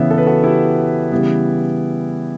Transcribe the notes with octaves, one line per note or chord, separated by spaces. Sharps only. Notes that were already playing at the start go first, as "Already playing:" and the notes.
Already playing: C#3 E3 B3 C#5 E5
A4
B4
F#4 A4
E4 G4
C#3 E3 G3 B3